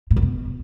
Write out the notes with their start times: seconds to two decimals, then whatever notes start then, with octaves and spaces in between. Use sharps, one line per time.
0.10 A2
0.16 F#2
0.22 B2